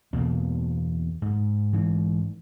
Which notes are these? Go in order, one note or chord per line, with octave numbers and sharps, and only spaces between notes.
E2 B2 A#3
G#2
G#2 E3